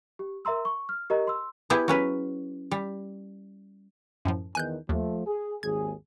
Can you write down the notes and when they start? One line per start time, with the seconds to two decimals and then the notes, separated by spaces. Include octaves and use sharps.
0.19 G4
0.45 A#4 E5 A#5 C6 E6
0.65 C#6
0.89 F6
1.10 G4 A#4 D#5 A#5
1.27 C6 E6
1.70 B3 E4 G4 G#4
1.88 F#3 C#4 B4
2.71 G3
4.25 F#2 A2 F3
4.55 E2 D#3 G#5 F#6 G6
4.89 D#2 F3 A3
5.26 G#4
5.63 G#1 D#2 G#4 G#6